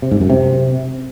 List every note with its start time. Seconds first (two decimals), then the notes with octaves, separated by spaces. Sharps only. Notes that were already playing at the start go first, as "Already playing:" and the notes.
0.02 C3
0.11 G#2
0.21 F#2
0.30 C3